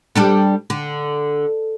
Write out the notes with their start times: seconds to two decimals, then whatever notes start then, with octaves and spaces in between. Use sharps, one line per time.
0.15 G3 D4 A4
0.70 D3